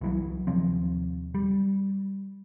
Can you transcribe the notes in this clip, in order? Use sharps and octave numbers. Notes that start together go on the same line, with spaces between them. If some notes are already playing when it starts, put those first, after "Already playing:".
C2 E3 F#3
D#2 C3 F3 C4
G3